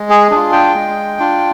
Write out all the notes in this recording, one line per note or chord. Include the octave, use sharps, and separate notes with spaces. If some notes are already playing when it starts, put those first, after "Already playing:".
Already playing: G#3
G#4
D4 F4 G#4
G5
G#3
D4 F4